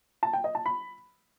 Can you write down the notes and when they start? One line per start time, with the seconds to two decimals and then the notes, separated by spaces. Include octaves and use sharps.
0.23 A5
0.33 G5
0.44 D#5
0.55 A5
0.66 B5